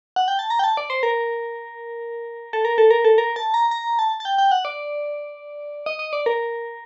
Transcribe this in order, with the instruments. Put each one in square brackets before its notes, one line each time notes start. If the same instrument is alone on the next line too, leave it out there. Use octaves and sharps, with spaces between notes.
[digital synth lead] F#5
G5
A5
A#5
G5
A5
D5
C5
A#4
A4
A#4
A4
A#4
A4
A#4
A5
A#5
A#5
A5
A5
G5
G5
F#5
D5
D#5
D#5
D5
A#4